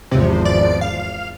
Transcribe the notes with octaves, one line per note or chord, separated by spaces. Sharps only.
G#1 E2 C3 F3
D5
F5